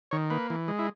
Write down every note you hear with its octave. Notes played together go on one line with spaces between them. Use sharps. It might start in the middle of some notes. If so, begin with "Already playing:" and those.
D#3 C#5
A#3 B4
E3
G#3
E4